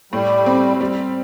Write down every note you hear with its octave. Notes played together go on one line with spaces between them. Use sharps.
A2 G3
C4
G3